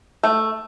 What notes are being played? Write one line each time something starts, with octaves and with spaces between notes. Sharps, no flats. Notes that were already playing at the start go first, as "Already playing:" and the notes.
A3